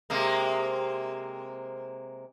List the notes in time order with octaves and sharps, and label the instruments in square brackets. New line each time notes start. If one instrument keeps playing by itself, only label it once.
[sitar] C3 G#3 A#3